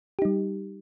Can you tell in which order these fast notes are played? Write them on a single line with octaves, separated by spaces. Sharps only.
G4 D#4 G3